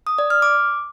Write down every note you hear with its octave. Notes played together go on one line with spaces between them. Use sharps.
D#6
D5
F6
D6